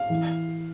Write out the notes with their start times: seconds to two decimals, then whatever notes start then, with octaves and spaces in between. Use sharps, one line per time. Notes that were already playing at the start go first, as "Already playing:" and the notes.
Already playing: F5
0.10 E3